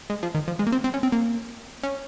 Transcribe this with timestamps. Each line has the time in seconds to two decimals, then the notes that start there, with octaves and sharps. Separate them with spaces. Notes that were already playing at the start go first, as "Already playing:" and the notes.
0.10 G#3
0.23 F3
0.35 D#3
0.48 F3
0.59 G#3
0.67 A#3
0.72 C4
0.84 C4
0.94 C#4
1.03 C4
1.12 A#3
1.83 C#4